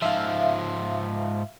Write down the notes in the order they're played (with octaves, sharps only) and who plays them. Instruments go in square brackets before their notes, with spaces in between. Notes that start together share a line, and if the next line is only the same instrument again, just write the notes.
[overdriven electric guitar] G#2 F3 [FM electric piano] E5 F5